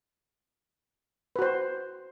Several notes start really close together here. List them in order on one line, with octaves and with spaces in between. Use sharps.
B4 F#4 C5